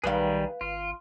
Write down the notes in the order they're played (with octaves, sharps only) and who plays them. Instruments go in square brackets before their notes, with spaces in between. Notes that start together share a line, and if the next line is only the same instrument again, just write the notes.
[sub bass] B1 [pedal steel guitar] D#3 G3 G#4 [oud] B4 F5
[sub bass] G#1 [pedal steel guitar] F4